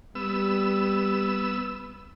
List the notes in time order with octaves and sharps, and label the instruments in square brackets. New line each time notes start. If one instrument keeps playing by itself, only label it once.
[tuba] G3 [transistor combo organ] B3 E6